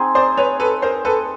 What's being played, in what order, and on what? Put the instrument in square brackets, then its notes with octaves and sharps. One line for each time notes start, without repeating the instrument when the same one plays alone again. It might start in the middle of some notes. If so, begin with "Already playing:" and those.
Already playing: [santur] C4 D#4 G#4
[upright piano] C5 D5
B4 C#5
A4 B4
A#4 C5
A4 B4